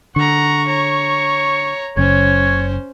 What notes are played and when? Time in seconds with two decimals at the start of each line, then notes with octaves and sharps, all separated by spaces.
0.16 D3 F#5 A#5 C#6
0.67 C#5 A#5
1.97 F#1 F#2 C#3 C#4 C5 C#5